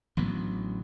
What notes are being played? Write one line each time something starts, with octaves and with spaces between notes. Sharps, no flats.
A1 D3 F#3 B3